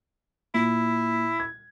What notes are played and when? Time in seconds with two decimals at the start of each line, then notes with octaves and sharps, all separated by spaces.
0.54 A#2 E4
1.40 G#6